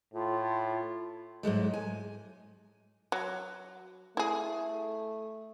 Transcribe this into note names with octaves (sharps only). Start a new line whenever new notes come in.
A2 F4
G#2 F#3 G#3 A3
G#5
F#3
A3 E4 G#4